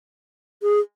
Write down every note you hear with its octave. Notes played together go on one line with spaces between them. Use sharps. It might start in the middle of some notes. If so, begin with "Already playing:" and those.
G#4